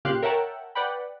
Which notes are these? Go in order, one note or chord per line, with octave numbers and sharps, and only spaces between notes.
A#2 C#3 G4 F5 C6 F#6
A#4 C#5 E5 F#5 G5 A5
B4 D5 F#5 G5 B5